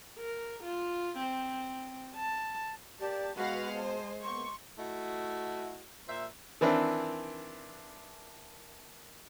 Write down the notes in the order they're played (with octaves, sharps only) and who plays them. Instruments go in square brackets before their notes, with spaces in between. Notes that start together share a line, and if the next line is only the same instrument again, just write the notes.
[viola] A#4
F4
C4
A5
[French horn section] A#3 D5 [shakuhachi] G4 [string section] A5
[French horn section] B2 [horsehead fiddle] G#3 [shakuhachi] F#4 [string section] B4 F5 F#5
[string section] C5 [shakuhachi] A5
[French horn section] A#3 B3 [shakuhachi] C6 [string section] C#6
[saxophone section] A3 E4 F#4 D#5
A#2 C5 E5
[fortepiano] D#3 E3 C4 D4 E4